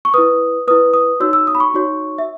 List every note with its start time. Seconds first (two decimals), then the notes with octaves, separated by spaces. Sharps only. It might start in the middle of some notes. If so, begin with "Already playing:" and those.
0.05 C#6
0.14 E4 B4 D#6
0.68 E4 B4 D#6
0.94 D#6
1.20 D#4 F#4 C#5 E6
1.33 E6
1.47 D#6
1.55 B5
1.60 C#6
1.74 D#4 F#4 C#5
2.18 E5